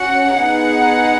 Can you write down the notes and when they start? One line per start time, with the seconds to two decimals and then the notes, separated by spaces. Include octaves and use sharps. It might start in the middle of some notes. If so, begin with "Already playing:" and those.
Already playing: C#4 F#4 F#5
0.34 B3 D#4 G#4 F#5